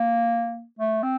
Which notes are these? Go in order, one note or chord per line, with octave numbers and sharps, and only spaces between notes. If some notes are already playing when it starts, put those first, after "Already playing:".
Already playing: A#3
A3
C4